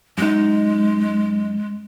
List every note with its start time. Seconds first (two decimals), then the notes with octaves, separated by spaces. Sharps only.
0.18 F#2 G#3 D#4